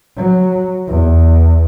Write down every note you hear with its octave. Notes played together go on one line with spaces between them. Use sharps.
F#3
E2